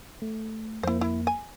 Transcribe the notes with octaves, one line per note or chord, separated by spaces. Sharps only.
A3
F2 A#3 E4 C5
E4
G#5